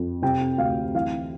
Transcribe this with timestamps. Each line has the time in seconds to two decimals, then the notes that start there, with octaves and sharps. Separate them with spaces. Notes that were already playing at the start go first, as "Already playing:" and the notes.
Already playing: F2
0.22 C3 G5
0.58 D2 F5
0.95 E3 F5